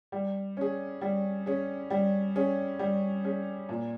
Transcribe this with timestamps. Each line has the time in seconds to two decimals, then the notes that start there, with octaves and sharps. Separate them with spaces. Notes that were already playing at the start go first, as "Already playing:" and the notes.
0.12 G3
0.57 C#4 G#4
1.01 G3
1.46 C#4 G#4
1.90 G3
2.36 C#4 G#4
2.79 G3
3.24 C#4 G#4
3.69 A#2